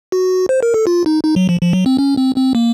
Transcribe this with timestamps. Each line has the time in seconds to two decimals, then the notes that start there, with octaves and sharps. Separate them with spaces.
0.12 F#4
0.49 C5
0.63 A#4
0.74 A4
0.87 F4
1.06 D#4
1.24 D#4
1.36 F#3
1.49 F3
1.61 F3
1.73 F#3
1.86 C4
1.98 C#4
2.17 C4
2.36 C4
2.55 A#3